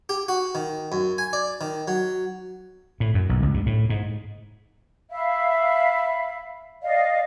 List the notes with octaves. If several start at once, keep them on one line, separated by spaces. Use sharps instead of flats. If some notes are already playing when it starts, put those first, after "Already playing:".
G4
F#4
D#3
F#2
G#5
D5
D#3
F#3
A2
F#2
B1
C#2
G2
A2
G#2
E5 F5 B5
D5 D#5 F5